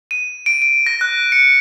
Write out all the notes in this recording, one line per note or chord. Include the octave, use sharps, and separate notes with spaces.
D#7
D7
D7
A#6
F#6
C#7